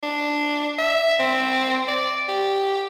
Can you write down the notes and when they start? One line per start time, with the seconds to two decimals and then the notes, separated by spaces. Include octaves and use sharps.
0.03 D4
0.79 E5
1.20 C4
1.88 D5
2.28 G4